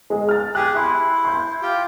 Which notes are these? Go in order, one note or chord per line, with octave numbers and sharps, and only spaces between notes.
G#3 G#4
F6 A6
G4 G#4 F#6
E4 E5 C6
C6 G6
F4 G4 G5